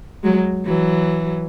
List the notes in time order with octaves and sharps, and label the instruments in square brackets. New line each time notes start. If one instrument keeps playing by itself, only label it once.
[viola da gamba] F#3 G#3
E3 F#3